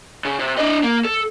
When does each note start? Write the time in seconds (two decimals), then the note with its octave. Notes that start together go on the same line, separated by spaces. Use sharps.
0.25 C#3
0.39 C3
0.58 D4 D#5
0.83 A#3
1.05 A4